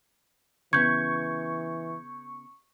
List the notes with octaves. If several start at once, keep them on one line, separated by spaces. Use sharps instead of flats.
C#3 E3 B3 C#6 G6 G#6